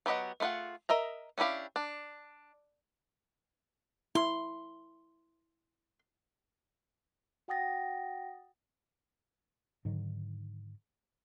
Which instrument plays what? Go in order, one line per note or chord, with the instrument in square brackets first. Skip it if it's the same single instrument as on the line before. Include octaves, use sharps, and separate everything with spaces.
[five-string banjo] F#3 B3 G4 D#5 F#5
A3 E4 F4 G#4 F#5
A#4 D#5 E5 A#5
C#4 D4 E4 G4 F5
D4
[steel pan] E4 [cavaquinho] C6
[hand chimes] F#4 F#5 G5 D#6 A6 A#6
[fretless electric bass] G#2 D3 D#3 F#3